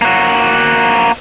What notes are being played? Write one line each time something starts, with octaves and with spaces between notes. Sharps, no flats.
A#3 F#4